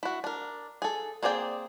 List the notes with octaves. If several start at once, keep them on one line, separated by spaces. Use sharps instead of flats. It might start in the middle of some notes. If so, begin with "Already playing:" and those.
E4 F#4
D4 A#4
G#4 A4
A#3 C4 G#4 D5 G5